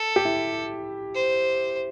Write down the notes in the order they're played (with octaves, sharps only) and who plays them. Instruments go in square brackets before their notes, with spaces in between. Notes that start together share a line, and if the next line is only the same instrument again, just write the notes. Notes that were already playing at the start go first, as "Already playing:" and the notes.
Already playing: [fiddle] A4
[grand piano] G4
E4
[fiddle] C5